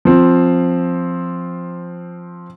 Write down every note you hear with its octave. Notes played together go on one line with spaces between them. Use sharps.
F3 C4